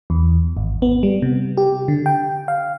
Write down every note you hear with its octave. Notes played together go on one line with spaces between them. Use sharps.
E2
G#1
B3
G3
C3
G4
D3
G5
F5